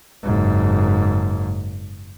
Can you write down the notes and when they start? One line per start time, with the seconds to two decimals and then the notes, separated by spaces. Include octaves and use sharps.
0.23 F#1 G#2